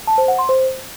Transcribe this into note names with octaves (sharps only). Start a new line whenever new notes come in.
A5
C5
F#5
C6
C5